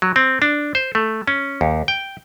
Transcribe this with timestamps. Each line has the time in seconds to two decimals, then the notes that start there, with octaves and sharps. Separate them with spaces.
0.02 F#3
0.16 C4
0.42 D4
0.75 C5
0.95 A3
1.27 C#4
1.61 D#2
1.88 G5